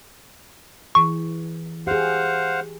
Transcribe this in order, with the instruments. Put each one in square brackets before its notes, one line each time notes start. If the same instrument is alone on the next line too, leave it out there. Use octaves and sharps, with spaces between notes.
[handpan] E3 G#4 [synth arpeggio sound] C#6
[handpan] G4 G#4 [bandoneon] C5 F5 F#5